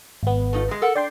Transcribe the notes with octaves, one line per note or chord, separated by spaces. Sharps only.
G#1 B3
A3 D#4 F4
G#2 G#3
A4 A#4 F#5
D4 D5 G5 C6